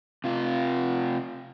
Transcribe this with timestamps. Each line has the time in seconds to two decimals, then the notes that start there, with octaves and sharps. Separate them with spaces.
0.24 C3 F4